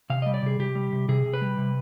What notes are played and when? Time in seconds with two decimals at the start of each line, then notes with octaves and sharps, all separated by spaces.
0.10 C3 F5
0.22 G3 D#5
0.34 D5
0.43 C3 G#4
0.59 C3 G4
0.75 G3
0.92 C3
1.09 C3 G#4
1.26 C3
1.34 B4
1.42 G3
1.58 C3